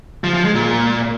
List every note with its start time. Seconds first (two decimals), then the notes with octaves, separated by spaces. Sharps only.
0.24 F3
0.34 F3
0.44 G#3
0.55 A#2